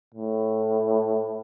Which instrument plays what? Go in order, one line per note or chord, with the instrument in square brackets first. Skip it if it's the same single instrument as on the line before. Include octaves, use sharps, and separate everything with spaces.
[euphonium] A2